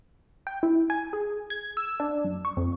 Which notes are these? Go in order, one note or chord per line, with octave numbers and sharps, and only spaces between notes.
G5
E4
G#5
G#4
G#6
E6
D4
F#2
C#6
F2